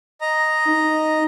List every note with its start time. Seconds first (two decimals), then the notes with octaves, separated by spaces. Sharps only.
0.21 D#5 A#5
0.65 D#4